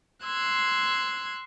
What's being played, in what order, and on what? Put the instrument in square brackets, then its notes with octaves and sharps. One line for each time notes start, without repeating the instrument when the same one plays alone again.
[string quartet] C6 E6 F#6 G#6